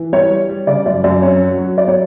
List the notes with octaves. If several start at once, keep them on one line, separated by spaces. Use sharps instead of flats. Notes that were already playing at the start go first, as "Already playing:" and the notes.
Already playing: E3
G3 C#5
G3
G3
C#3 D5
F#2 D5
F#2 D5
C#4 C#5
F#3
F#3
F#3 D5
C#5